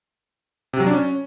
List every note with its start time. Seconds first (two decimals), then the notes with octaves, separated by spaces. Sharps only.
0.73 C3
0.80 F#3
0.87 D4
0.93 C#4